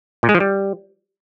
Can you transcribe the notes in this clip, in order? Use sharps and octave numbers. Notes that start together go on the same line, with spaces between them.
A#2
G#3
F3
G3